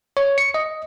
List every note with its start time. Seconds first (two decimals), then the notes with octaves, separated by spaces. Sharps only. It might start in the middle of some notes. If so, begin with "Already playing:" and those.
0.17 C#5
0.38 C#7
0.54 D#5